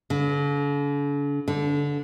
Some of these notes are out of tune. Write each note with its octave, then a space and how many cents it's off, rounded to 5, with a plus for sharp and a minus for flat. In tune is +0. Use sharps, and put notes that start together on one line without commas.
D3 -45
D3 -20